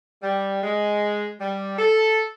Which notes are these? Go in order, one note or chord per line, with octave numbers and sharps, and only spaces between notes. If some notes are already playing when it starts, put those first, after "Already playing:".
G3
G#3
G3
A4